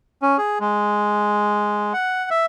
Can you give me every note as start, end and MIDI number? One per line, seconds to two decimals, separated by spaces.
0.22 0.38 61
0.38 0.59 68
0.60 1.93 56
1.93 2.29 78
2.31 2.46 76